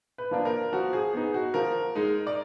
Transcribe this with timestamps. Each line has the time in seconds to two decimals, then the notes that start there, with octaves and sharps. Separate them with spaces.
0.18 B4
0.31 F3 A#3 D4
0.45 A#4
0.72 F3 F#4
0.93 G#4
1.13 B3 D#4 G#4
1.34 F#4
1.54 F3 A#4
1.95 G#3 D#4
2.27 D5